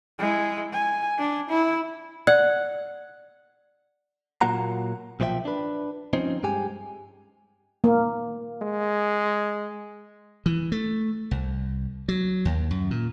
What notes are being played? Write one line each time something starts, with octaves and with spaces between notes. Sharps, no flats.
G#3 E4
G#5
D4
E4
D5 F#5
A#2 F#3 A#3 F4 F#5 A#5
B1 A#2 F3 C#4 E5 G5
D4 B4
F3 C4 C#4 D#4
G2 G#3 G4 G#5
A#3
G#3
E3
A3
C2
F#3
D#2
F#2
A#2